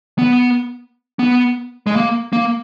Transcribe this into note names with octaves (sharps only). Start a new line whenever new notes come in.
B3
B3
G#3
A#3
A#3